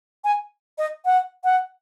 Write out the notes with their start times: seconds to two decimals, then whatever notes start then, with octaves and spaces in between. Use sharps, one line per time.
0.24 G#5
0.78 D#5
1.05 F#5
1.44 F#5